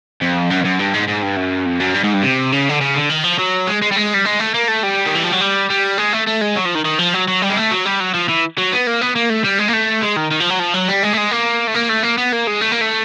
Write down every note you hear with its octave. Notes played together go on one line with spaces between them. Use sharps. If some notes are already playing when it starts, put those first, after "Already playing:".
F2
F#2
F2
F#2
G2
G#2
G#2
G2
F#2
F2
F#2
G2
G#2
G2
C3
C#3
D3
C#3
D3
D#3
F3
F#3
G#3
G#3
G3
G#3
G3
G#3
A3
A#3
A3
G3
D#3
E3
F3
F#3
G3
G3
G#3
A3
A3
G#3
F#3
F3
D#3
D#3
F3
F#3
F#3
G3
G#3
A3
F#3
G3
F#3
F3
E3
F#3
B3
A#3
B3
A#3
A3
G3
G#3
A#3
A3
G#3
D#3
D#3
F3
F#3
F3
F#3
G3
G#3
A3
G#3
A#3
A3
A#3
A3
A#3
B3
A#3
G#3
A3
A#3
A3